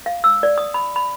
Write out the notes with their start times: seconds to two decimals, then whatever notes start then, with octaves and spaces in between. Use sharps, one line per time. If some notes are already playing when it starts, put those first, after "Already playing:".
0.06 F5
0.24 E6
0.43 D5
0.58 D#6
0.74 B5
0.96 B5